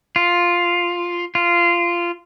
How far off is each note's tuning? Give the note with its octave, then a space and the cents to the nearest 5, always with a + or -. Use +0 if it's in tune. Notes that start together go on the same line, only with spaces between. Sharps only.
F4 +0
F4 -15